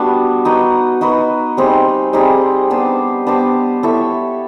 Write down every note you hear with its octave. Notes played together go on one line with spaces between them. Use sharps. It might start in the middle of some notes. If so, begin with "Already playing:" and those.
Already playing: G3 B3 D4 F#4
D#4 F#4 B4
D#4 F#4 B4
G3 C4 D#4 G#4
G3 C4 D#4 G#4
B3 D4 G4 C5
B3 D4 G4 C5
E4 A4 C#5 E5